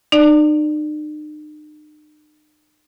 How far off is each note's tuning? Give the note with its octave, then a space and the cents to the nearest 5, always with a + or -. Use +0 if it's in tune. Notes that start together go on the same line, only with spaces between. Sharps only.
D#4 -45 D5 +15